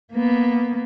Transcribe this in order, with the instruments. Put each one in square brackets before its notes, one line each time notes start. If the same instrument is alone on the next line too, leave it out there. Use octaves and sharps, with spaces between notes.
[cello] A#3 B3